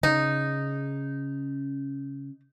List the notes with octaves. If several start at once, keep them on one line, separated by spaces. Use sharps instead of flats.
C#3 D#4